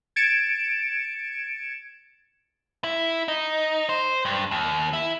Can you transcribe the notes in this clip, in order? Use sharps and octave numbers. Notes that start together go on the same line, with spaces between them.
G#6 A6 C#7 D7 E7
E4
D#4
C5
G2
D#2
E4